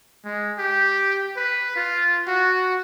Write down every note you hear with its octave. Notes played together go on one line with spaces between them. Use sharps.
G#3
G4
B4
F4
F#4